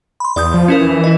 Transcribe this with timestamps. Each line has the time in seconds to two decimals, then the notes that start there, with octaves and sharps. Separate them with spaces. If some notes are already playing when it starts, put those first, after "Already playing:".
0.20 B5 C6
0.36 E2 D5 D#6 G6
0.54 F3
0.68 C#4 E4 A#4
0.80 E3
1.04 E4 D#5